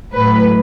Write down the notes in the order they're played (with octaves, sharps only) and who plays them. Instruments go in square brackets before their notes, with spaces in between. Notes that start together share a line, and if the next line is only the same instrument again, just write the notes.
[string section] A2 F#3 B4